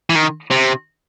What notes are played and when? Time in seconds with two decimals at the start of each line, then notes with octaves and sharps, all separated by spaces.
0.10 E3
0.15 D#3
0.50 C3